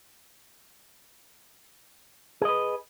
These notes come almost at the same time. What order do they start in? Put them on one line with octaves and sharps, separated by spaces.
G#4 D#5 B4